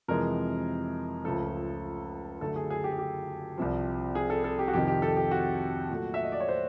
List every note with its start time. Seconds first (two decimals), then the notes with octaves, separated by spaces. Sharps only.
0.08 F2 C3 E3 G#3 A#4
1.24 C#2 C#3 F3 A3 A4
2.41 F#2 D3 F#3 A3 A4
2.56 G#4
2.70 G#4
2.84 G4
2.92 G#4
2.99 G4
3.58 C2 C3 F3
4.15 G#4
4.30 A4
4.44 A4
4.59 G4
4.68 F#4
4.73 F2 C3 D#3 G4
4.88 G4
5.02 A4
5.17 G4
5.31 F#4
5.90 A#2 F#3 A3
6.14 E5
6.23 D#5
6.32 D5
6.40 C#5
6.49 C5